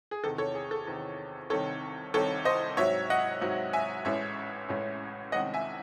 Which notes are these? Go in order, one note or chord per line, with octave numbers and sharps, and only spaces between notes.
G#4
E2 C3 D#3 A4
A4 C#5
G#4
A4
E2 C3 D#3
C2 C3 D#3 A4 C#5
C2 C3 D#3 A4 C#5
C5 D#5
G#2 F#3 C4 C#5 E5
D#5 F#5
G#2 F#3 C4
E5 G#5
A1 A2 G#3 C#4 C#5 E5
A1 A2 G#3 C#4
C2 C3 D#3 G#3 C#4 D#5 F#5
E5 G#5